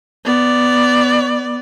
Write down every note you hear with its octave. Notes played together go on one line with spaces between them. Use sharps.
B3 D5